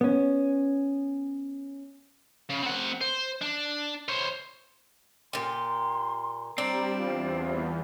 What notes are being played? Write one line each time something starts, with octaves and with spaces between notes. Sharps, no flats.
B3 C#4
C#3
C4 F#5
C5
D4
C5 C#5
A#2 G4 C6
G3 C4 D4 A#5
E2 F4